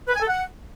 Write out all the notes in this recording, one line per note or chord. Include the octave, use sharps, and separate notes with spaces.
B4
G#5
A4
F#5